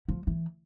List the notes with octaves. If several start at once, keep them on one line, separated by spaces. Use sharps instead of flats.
F3
E3